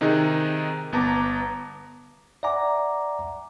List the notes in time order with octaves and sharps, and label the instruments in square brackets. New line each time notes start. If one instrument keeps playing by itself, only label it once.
[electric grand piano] C3 D#3 D#4 G#4 F#6
G1 B3 A5 A#5 D6
[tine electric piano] D5 E5 F#5 G#5 A#5 D6